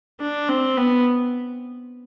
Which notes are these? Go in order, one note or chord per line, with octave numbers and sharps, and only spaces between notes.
D4
C4
B3